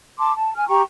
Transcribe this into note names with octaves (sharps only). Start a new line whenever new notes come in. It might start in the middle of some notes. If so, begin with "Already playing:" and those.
A5 C6 D6
A5
G#5 F6
G4 G5 A#5 C#6